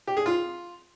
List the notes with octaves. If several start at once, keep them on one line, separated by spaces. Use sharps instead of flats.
G4
G#4
F4